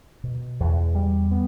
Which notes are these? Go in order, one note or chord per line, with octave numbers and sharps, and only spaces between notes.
B2
E2
G3
B3